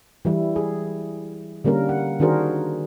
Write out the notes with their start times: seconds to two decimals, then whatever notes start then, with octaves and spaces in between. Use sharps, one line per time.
0.25 E3 G3 E4
0.56 G#4
1.64 D3 G3 A#3 C#4 A#4
1.89 F#5
2.20 D#3 D4 F#4 G#4 A#4 C5